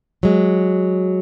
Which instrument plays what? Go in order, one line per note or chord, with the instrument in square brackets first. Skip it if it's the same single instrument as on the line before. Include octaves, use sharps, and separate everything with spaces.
[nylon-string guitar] F#3 G#3